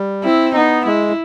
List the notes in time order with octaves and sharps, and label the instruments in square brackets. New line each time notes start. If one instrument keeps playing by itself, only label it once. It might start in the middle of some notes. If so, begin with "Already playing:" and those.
Already playing: [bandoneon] G3
[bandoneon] C4 [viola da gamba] E4
[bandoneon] B3 [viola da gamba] D#4
[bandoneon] G#3 [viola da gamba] E4